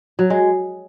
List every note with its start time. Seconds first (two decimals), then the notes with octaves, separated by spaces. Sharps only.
0.19 F#3
0.30 G#3